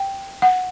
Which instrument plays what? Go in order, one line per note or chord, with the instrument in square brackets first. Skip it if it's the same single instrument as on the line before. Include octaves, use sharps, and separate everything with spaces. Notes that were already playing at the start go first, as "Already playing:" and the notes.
Already playing: [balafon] G5
F#5